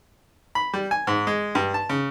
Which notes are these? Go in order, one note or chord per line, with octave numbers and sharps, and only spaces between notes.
B5
G3
G#5
G#2
G#3
G2
A5
C#3